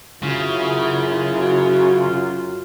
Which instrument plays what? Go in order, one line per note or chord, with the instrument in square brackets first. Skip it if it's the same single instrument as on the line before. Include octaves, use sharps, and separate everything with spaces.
[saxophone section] F#2 F4 [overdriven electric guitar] C#3 [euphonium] E4
[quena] F#4